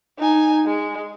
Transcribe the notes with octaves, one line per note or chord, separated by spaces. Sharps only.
D#4 G#5
G#3